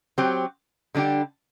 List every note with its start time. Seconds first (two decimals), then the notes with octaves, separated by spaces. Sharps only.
0.18 F#3 C4 G4
0.95 D3 G3 D4 G4